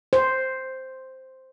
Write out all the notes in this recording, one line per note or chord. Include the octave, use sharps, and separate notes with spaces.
C5